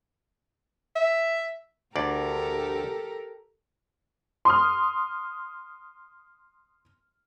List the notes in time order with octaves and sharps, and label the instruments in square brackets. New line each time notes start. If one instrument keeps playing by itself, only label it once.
[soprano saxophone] E5
[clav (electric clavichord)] D2 D5 [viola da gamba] G4 A4 A#4
[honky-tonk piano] C6 D#6 F6